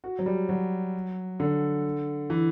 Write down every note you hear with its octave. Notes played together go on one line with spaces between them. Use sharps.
F#4
F#3
G3
F#3
D3
E3